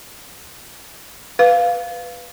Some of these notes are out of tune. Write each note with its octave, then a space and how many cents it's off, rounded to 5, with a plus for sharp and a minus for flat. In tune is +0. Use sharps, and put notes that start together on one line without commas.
B4 +0 F5 +0